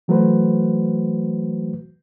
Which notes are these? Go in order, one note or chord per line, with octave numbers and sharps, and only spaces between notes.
E3 F#3 A3 F#4 B4 C5